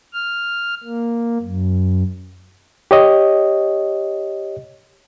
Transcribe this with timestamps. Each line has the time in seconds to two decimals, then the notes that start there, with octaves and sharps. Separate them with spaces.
0.13 F6
0.84 A#3
1.43 F#2
2.91 G4 C#5 D#5